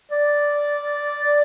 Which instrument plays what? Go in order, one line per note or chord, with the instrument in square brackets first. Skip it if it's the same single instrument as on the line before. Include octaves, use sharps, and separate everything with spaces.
[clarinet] D5